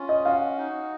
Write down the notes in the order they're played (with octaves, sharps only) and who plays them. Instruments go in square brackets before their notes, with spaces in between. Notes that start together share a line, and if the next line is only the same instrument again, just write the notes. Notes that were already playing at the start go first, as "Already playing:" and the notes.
Already playing: [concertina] C#4 F4
[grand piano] D#5
[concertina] F#4 [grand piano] F5
[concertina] D#4